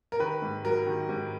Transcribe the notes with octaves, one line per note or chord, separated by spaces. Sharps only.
A#4
D#3 B4
G#2
F#3 A#4
D#3
G#2